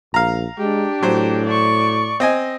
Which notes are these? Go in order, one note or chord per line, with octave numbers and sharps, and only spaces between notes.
A#1 F5 A#5
G#3 D4 G4
A2 F#3 C5
D5 C#6
C4 D#5 G#5